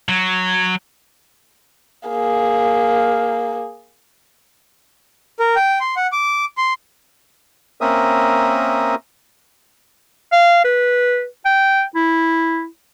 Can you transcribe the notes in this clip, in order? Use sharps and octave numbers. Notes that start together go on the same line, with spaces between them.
F#3
A#3 G#4
A#4
G5
C6
F#5
D6
C6
A#3 C4 C#4 A#4 E5 D#6
F5
B4
G5
E4